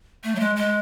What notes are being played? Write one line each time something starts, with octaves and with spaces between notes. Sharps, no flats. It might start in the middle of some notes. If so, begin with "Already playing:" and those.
A3
F#3
G#3
G#3